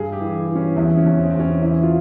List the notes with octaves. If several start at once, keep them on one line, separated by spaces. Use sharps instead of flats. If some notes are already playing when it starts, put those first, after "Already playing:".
Already playing: G2 G#4
G4
E3
E3
C#4
E2 E4
C#4
E2
C4
E2 C4
C#4
E3 E4
F4